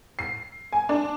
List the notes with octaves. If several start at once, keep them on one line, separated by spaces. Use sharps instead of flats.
C7
G#5
D4